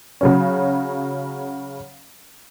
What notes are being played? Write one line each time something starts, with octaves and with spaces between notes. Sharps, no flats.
C#3 F#3 C#4